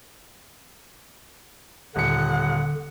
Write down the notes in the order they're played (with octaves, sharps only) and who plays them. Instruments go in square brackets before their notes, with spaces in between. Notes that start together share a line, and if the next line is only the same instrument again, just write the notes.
[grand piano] D#1 C#7 [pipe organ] D3 [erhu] F#5